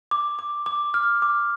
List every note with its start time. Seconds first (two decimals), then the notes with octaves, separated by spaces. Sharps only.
0.11 D6
0.39 D6
0.66 D6
0.94 F6
1.22 D6